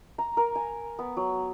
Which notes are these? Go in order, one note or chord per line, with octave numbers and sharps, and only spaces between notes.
A#5
A#4
G#5
B3
F#3